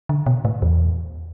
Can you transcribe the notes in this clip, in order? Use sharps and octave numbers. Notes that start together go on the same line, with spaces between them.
D3
B2
A2
E2